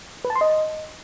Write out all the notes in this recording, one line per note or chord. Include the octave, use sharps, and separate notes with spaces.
B4
A5
C6
D#5